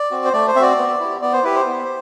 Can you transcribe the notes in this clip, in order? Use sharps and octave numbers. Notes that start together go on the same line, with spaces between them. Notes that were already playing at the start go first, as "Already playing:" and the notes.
Already playing: D5
C4 F#4
C5
A3 D5
C5
C4 F#4 D5 E5
B3
E4 G4
B3 D5
C5
E4 G4 B4
C5
B3